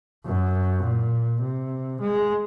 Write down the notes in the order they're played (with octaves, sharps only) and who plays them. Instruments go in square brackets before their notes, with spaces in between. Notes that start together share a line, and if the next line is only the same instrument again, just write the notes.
[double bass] F#2
A#2
C3
G#3